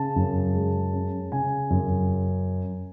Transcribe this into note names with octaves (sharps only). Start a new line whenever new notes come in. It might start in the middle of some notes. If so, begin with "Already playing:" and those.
Already playing: C#3 A5
F#2
G#3
C#4
C#3 G#5
F#2